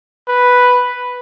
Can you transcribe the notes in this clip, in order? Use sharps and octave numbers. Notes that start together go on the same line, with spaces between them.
B4